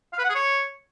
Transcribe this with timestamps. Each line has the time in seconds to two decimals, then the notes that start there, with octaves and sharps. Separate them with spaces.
0.13 F5
0.18 B4
0.24 F#5
0.29 G#4
0.35 C#5